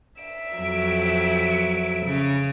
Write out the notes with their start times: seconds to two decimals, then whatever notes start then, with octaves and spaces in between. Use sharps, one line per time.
0.21 E5 D7
0.57 F2 F#3
2.06 C#3